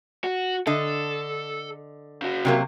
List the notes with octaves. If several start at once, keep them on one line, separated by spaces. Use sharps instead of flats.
F#4
D3 A4 D#5
C#3 F#4
C3 F#3 A#3